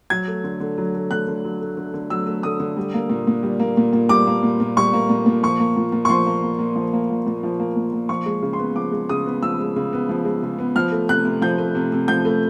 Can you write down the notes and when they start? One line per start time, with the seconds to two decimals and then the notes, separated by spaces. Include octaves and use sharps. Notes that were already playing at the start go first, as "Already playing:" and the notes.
0.10 F#3 G#6
0.28 A3
0.44 D3
0.60 D3
0.78 F#3
0.95 A3
1.11 D3 F#6
1.28 D3
1.44 F#3
1.61 A3
1.77 D3
1.94 D3
2.10 F#3 E6
2.26 A3
2.43 D3 D#6
2.60 D3
2.77 G3
2.94 A#3
3.10 A#2
3.27 A#2
3.43 G3
3.60 A#3
3.77 A#2
3.93 A#2
4.09 G3 D6
4.27 A#3
4.43 A#2
4.60 A#2
4.77 G3 C#6
4.93 A#3
5.09 A#2
5.26 A#2
5.43 F3 C#6
5.60 A#3
5.77 A#2
5.92 A#2
6.05 C#6
6.09 F3 C6
6.26 A#3
6.43 A#2
6.59 A#2
6.76 F3
6.93 A#3
7.10 A#2
7.27 A#2
7.43 F3
7.60 A#3
7.76 A#2
7.93 A#2
8.09 F3 C#6
8.26 G#3
8.42 C#3
8.53 C6
8.59 B3
8.76 F3 D6
8.92 G#3
9.09 C#3 D#6
9.26 B3
9.43 F3 E6
9.59 G#3
9.76 C#3
9.93 B3
10.09 F3
10.25 G#3
10.43 C#3
10.59 B3
10.76 F3 F6
10.92 A3
11.09 C3 F#6
11.25 C3
11.42 F3 G6
11.58 A3
11.75 C3
11.92 C3
12.08 F3 G6
12.25 A3